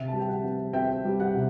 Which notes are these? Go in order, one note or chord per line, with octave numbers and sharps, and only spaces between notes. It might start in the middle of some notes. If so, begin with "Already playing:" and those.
Already playing: C3 E5
G3 A5
G5
F#5
C4
C4 E5 G5
G3
F#5
C3